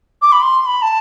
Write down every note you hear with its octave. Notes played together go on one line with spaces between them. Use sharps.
D6
B5
C6
C6
B5
A5